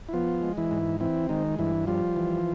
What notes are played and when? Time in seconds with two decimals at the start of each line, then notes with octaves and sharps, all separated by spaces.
0.09 E4
0.13 F3 B3 F4
0.42 G#3
0.57 E3 E4
0.71 G#2
1.00 E3 C4 E4
1.29 D#3 G#3 D#4
1.59 G2 E3 E4
1.87 F3 G3 F4
2.16 E3